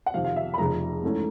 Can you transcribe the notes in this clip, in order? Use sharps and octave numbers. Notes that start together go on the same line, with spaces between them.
F#5
F2 C3 D#3 F5
F5
E5
B5
F1 F2 C#3 F3 A#5
G#2 E3 A3 C#4